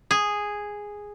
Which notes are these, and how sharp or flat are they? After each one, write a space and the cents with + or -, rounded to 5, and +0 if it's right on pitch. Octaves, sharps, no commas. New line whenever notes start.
G#4 -5